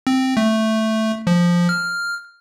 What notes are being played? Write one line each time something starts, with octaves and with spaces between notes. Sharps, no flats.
C4
A3
F3
F6